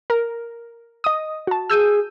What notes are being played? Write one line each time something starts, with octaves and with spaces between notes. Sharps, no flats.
A#4
D#5 D#6
F#4 A5
G#4 E6 G6 D#7